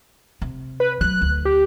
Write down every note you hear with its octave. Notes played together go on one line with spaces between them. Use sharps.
C3
B4
F#3 G3 F#6
D2
G4